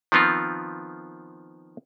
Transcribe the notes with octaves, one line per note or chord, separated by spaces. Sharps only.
D#3 F3 B3 C4 F4